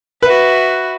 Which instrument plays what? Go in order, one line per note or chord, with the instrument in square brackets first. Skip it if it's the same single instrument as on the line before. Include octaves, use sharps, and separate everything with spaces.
[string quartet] F#4 E5 [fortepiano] B4